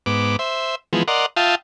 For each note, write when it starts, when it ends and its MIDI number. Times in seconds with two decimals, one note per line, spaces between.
0.06 0.36 44
0.06 0.36 59
0.06 0.36 86
0.39 0.75 72
0.39 0.75 76
0.93 1.03 52
0.93 1.03 53
0.93 1.03 56
0.93 1.03 59
1.08 1.26 70
1.08 1.26 74
1.08 1.26 75
1.08 1.26 78
1.08 1.26 84
1.37 1.55 65
1.37 1.55 76
1.37 1.55 77
1.37 1.55 79
1.37 1.55 81
1.37 1.55 87